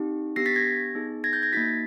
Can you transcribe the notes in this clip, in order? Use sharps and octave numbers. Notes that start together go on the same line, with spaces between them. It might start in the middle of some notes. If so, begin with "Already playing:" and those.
Already playing: C4 D#4 G4
B3 D4 G4 A#6 C7
A6 B6
G#6 A#6
B3 D#4 G#4
G#6 A#6
G6 A6
G#6 A#6
A#3 D#4 F#4 A6 B6